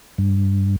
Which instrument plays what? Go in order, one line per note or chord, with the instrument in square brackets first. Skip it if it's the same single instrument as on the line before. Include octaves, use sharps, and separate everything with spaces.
[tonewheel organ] G2